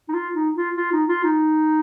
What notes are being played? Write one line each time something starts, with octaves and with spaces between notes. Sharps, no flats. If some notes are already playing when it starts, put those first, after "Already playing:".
D#4
F4
D#4
F4
F4
D#4
F4
D#4